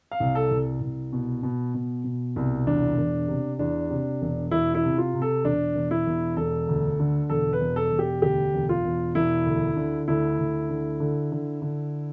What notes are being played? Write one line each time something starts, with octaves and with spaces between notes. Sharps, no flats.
F5
C2
A4
C2
C2
B2
B2
B2
B2
C2
E1 D4
E1
C3
E2 D4
C3
E1
E1 E4
E4
C3
F4
C3
A4
E1 D4
E1
E4
E1
E1 A4
D2
D3
E1 A4
B4
E1
A4
E1
G4
D2 G4
E1
F4
E1
E1 E4
D2
D3
D2 E4
D2
D3
D3
D3
D3